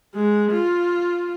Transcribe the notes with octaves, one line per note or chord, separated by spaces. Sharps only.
G#3
F4